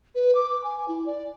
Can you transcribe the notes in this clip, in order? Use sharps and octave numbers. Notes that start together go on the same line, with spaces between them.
B4
D6
D6
G#5
E4
D5